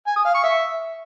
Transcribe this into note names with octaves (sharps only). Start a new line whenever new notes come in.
G#5
D#6
F5
C#6
E5